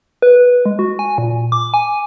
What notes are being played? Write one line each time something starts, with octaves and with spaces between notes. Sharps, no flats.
B4
G#3
F#4
G#5
A#2
D6
G#5